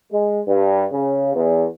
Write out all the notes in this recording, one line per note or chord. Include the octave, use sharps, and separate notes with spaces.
G#3
G2
C#3
E2